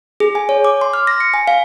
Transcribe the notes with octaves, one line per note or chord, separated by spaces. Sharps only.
G#4
G#5
C#5
D6
C6
F6
A#6
C#7
G#5
F5